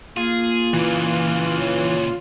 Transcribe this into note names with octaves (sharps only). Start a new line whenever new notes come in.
A#3 F4 G#4
A#2 C#3 E3
C#5